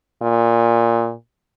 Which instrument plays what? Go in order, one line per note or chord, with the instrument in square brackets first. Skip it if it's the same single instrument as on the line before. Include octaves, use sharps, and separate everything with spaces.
[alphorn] A#2